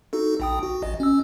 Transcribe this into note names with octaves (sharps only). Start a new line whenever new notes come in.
D#4 F#4 A4
A#1 G5 D#6
F#4
A1 D#5
C#4 E6